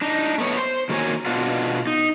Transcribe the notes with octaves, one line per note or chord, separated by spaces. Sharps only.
D4 D#4
A3 B3 C#5
C5
D#3 A#3 F#4 A#4 C#5 G#5
B2 D4 F4 F#4
D#4